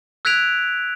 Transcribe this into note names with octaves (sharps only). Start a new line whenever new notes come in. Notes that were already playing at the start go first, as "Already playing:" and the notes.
E6 F#6 G#6 B6 D7 F7